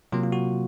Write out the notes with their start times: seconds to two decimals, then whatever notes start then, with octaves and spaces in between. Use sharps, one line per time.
0.12 C3 F#3 A#3 F4
0.24 F4
0.32 F#4